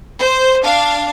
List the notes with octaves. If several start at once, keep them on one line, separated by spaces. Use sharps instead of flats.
C5
D4 F5